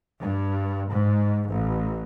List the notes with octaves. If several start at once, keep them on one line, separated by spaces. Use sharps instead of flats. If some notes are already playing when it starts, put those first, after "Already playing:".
G2
G#2
A1